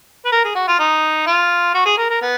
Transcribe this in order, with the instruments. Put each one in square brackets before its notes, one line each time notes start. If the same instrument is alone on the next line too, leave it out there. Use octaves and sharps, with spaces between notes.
[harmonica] B4
A#4
G#4
F#4
F4
D#4
F4
F#4
G#4
A#4
A#4
B3